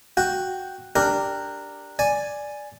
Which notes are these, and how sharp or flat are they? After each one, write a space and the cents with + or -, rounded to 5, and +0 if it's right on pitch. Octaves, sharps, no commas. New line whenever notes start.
F#4 +0 G5 +0
D4 +0 G4 +0 A#4 -15
D5 +0 G#5 +0